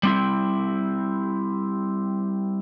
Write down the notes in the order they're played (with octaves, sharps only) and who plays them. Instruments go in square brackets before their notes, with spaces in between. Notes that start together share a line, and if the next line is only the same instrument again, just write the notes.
[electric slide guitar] G3 C4 E4